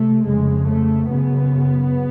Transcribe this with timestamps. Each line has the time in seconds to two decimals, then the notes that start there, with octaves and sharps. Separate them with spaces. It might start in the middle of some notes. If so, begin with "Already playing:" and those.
Already playing: C3 A3
0.24 F2 C#3 G#3
0.67 A3
1.09 F#2 C#3 B3